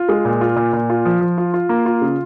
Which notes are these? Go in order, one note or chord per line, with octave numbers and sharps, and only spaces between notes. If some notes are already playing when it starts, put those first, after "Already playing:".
Already playing: F4
G#3
A#2
F4
A#2
A#2
F4
F3
F3
F4
F4
A#3
F4
C#3